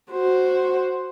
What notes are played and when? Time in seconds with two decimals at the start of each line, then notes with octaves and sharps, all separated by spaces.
0.12 F#4 C5